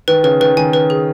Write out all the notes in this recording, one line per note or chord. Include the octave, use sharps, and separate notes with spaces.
D#3 B4
C#3 B4
D#3 B4
D#3 G#5
B4
G#4